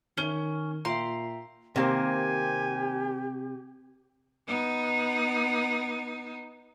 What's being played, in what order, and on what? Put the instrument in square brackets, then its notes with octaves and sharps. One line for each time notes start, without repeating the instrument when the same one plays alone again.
[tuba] D#3 [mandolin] C#4 [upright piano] G7
[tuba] A#2 [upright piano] F4 [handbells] E5 G5 A#5 [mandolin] C6
[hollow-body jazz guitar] C3 [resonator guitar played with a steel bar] D#3 A#3 C5 [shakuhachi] G4 [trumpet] G#5
[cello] B3 D#4